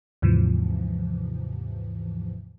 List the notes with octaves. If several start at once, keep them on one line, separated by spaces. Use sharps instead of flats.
D#2 G#2 C3 E3 F3